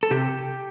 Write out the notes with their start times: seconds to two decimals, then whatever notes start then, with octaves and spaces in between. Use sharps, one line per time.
0.03 A4
0.11 C3 G4